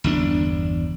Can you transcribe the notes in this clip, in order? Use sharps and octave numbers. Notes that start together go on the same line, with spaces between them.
G1 E2 D4